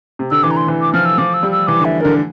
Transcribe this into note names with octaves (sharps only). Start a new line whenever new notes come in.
C3
D3 E6
E3 D6
A#5
C6
E3
D6
F3 F6
E6
F3 D6
E6
G3
E6
E3 D6
D3
E5
D3 A#4